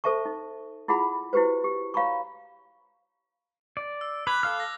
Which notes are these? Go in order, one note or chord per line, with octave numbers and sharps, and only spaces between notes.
A4 C5 E5 A5 C#6
D#4
E4 F4 G#4 F#5 B5
E4 F#4 G4 B4 C5
G4
C#5 F5 A#5 B5 C#6
D5
E6
B4 D6 F#6 G#6
A4 F5 F6
A#6